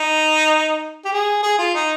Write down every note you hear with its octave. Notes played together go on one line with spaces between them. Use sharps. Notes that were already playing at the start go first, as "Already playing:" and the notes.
Already playing: D#4
G4
G#4
G#4
F4
D#4